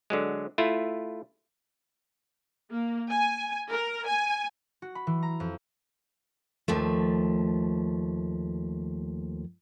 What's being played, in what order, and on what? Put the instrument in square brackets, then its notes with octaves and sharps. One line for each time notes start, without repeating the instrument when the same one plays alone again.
[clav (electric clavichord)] D3 F#3 G#3
A3 E4 F4
[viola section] A#3
G#5
A#4
G#5
[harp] F#4
B5
E3
A#5
F2
[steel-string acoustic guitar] D#2 F3 A3